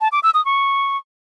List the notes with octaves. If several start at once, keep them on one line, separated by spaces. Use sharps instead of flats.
A5
D6
E6
D#6
C#6